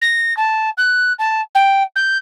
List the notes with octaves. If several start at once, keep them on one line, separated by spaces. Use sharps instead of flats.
A#6
A5
F#6
A5
G5
G6